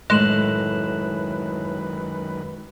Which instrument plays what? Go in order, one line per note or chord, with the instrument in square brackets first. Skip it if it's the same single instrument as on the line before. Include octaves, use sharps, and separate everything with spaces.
[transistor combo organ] F#2 D#3 B4 [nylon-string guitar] A2 [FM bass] G#3 [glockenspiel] F#6 E7 F#7